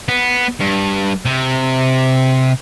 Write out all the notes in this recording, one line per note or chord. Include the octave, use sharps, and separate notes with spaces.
B3
G2
C3